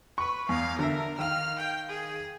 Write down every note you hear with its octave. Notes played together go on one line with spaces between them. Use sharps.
B4 C#6
E2 F5
D3 A#4 E5
D#3 F5 F6
G5
G#4